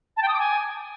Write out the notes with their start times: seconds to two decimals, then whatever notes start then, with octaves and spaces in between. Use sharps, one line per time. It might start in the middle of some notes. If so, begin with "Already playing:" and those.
0.17 A5
0.22 G5
0.28 D#6
0.34 D6
0.39 G#5